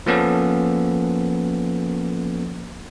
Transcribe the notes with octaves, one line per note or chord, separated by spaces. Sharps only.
F3 A#3 B3 C#4 A4